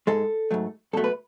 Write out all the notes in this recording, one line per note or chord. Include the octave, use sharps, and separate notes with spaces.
G#2 G#3 A4
G#2 F#3 A3
B1 B2 F#3 A3 A4
B4